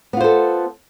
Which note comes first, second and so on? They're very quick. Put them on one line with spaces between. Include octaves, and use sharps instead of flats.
B3 F4 C5 A4